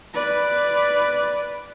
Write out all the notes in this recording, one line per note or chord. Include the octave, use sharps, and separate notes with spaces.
B4 D5